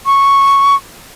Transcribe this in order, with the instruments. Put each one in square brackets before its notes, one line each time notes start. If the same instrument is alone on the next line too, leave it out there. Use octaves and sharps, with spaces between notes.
[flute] C#6